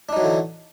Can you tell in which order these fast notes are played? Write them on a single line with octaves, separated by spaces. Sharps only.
D4 D#4 F#3 E3 D3